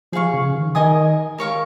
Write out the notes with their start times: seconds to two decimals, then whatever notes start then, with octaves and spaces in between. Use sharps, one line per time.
0.13 F3 G#4 F5 C#6
0.34 C#3
0.55 D#3
0.75 D#3 A#4 D#5 G#5 D#6
1.38 A#4 C#5 F5 C#6